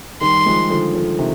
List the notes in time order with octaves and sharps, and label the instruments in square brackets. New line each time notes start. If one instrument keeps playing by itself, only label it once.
[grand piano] D#3 G3 [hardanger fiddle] C6
[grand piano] F3 G#3
D3 F3
D3 F3
C3 D#3